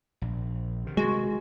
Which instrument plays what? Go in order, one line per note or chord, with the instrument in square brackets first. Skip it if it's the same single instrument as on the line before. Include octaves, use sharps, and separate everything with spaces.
[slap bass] A#1
C3 D#3
[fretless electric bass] G#3 [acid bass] F#4